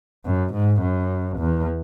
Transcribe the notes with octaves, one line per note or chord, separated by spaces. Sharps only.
F#2
G#2
F#2
E2